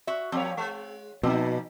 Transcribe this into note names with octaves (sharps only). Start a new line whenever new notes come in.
F#4 E5
F3 A#3 C4 C#5
G#3
B2 F3 C4 D#4